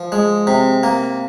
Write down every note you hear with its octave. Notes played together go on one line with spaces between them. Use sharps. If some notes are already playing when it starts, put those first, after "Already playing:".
Already playing: F3
G#3
C3
A#3